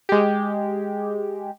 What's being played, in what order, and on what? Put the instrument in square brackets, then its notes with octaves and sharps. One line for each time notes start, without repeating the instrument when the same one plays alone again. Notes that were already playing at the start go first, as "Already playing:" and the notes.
[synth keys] G#3 G4